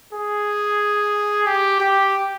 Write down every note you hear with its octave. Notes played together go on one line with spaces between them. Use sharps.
G#4
G4
G4